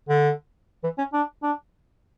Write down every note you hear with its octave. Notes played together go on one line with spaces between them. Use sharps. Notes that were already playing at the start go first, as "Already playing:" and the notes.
D3
E3
C#4
D4
D4